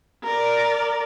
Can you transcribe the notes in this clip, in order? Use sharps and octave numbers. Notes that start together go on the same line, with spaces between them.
A#4 D5